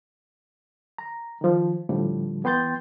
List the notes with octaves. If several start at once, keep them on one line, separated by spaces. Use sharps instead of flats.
A#5
D#3 F3
A2 D3 F3 G3
E3 B3 G5 C6 G6 A6